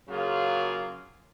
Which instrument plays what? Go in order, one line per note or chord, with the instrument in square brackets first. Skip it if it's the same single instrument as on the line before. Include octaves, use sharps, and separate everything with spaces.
[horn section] C#3 F#3 A#3 F4 G#4